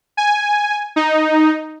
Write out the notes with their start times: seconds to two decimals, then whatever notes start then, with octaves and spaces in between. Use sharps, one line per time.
0.17 G#5
0.96 D#4